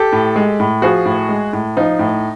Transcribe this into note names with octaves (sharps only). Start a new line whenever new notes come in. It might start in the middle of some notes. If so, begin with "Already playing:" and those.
Already playing: G4 A4
A2
G#3
A2
F3 F#4 G#4
A2
G#3
A2
F3 D#4
A2